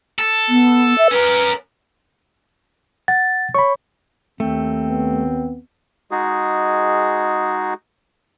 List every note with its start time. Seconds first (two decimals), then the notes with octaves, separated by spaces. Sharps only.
0.19 A4
0.49 B3
0.98 E5
1.11 C#4 A#4 B4
3.08 F#5 A6
3.55 C#5 B5 C#6
4.40 D#2 D#3 A3 C4
4.89 B3
6.11 G#3 D#4 F#4 G#4